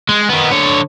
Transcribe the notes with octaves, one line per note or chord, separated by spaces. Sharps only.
G#3
D#3 B3
D3 C#5